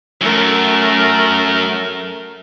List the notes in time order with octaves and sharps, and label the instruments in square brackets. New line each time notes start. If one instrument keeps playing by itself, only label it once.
[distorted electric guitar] F#2 [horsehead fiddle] A3 A#4